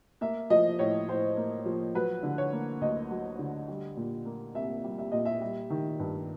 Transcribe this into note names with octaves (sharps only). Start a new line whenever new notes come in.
A#3 E5
F3 D#5
A2 C#5
A2 C5
A#3
F3
F#3 B4
D3
C#5
A#3
D2 D#5
F#3
D3
G3
A#2
A#3
C2 E5
G3
E5
A#2 D#5
E5
G3
D#3
G2